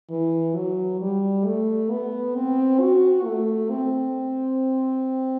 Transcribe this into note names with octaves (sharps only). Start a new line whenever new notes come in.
E3
F#3
G3
A3
B3
C4
F#4
A3
C4